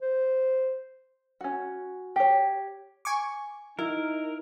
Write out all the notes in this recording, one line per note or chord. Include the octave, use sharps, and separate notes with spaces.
C5
C#4 F#4
G4 C#5
G#5 C#6 D6
D#4 E4 A#4